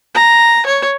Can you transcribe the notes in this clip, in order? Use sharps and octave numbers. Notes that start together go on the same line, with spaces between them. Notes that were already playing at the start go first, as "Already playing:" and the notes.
A#5
C#5